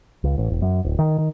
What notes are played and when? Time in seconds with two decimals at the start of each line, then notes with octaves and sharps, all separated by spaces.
0.24 C#2
0.38 A1
0.50 E1
0.62 F#2
0.85 D1
0.99 D#3
1.18 D#3